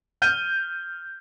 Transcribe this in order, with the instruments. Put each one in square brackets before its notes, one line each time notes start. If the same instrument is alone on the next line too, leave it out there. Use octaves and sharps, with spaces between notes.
[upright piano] F6 G6 D#7